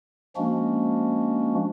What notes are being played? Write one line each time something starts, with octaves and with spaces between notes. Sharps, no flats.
F3 G#3 A#3 C#4 D4 F#4